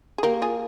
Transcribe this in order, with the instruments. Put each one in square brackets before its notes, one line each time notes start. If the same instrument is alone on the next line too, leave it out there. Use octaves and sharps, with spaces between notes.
[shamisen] G#4
[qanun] A#3 [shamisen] G4 A#4
[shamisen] F4 G#4